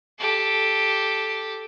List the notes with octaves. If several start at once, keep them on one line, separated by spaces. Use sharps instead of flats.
G4 A4